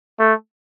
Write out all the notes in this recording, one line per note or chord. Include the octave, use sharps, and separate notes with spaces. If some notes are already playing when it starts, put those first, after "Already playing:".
A3